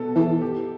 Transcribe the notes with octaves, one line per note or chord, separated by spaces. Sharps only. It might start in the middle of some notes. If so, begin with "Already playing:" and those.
Already playing: B2 B3 A4
E3 A4
G4